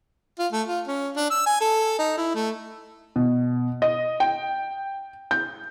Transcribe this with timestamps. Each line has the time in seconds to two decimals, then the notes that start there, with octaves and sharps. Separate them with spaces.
0.39 F4
0.52 A3
0.67 F4
0.87 C#4
1.16 D4
1.30 E6
1.46 G#5
1.61 A4
1.99 D#4
2.17 E4
2.35 A3
3.16 B2
3.82 D#5
4.20 G5
5.31 G6